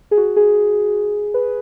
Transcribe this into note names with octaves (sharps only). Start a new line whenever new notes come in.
G#4
F#4
G#4
B4